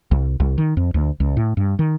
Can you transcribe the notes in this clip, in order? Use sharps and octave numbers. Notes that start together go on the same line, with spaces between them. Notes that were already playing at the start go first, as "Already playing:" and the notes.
C2
C2
D#3
F2
D2
C#2
A2
G2
D#3